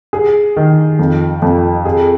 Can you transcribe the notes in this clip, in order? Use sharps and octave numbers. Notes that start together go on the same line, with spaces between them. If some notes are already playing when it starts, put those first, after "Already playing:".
G#4
D#3
F2
F2
G#4